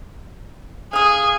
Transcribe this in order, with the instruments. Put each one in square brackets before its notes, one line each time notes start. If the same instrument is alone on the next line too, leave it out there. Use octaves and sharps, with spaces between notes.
[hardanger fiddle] G#4 [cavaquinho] F5 D#6